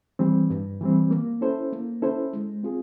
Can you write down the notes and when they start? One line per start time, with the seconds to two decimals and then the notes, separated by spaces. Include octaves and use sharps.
0.19 E3 G3 C4
0.50 G2
0.81 E3 G3 C4
1.11 A#3
1.41 C#4 E4 A4 C5
1.73 A#3
2.02 C#4 E4 A4 C5
2.33 G#3
2.63 C4 F4 G#4